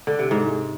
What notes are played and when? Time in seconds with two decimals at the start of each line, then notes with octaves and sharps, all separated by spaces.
0.07 D3
0.19 C3
0.31 G#2